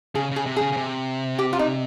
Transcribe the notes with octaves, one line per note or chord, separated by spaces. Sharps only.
C#3 G#4
C#3 G#4
C3
G#4
C#3
C#3
C3
G4
F4
D#4